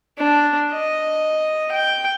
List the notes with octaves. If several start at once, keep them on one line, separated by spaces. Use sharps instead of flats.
D4
D#5
G5